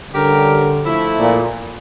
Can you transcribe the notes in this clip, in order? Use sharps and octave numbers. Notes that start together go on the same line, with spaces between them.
D3 G3 C#4 G4 A#4
F3 A3 E4
A#2